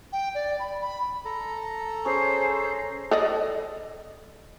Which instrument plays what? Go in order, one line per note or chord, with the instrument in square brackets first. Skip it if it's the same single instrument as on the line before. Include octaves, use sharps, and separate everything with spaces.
[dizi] G5
D5
B5
B5
[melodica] A4 A#5
[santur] C#4 G#4 G#5 [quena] C5
[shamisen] A4 D5 D#5